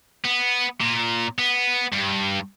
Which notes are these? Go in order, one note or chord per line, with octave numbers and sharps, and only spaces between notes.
B3
A#2
B3
G2